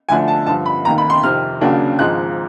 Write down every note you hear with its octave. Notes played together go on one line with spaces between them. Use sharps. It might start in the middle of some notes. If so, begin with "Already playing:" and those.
D2 D3 F3 A3 D4 G#5
A5
G2 D3 F3 A5
B5
F1 D#2 D#3 A#5
B5
C6
F2 C3 D#3 F6
D#2 C#3 F#3 A#3 D4
G#1 G#2 F3 G#3 F#6